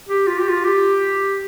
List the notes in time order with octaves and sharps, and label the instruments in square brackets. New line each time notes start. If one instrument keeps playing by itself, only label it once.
[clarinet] G4
F4
G4
F4
G4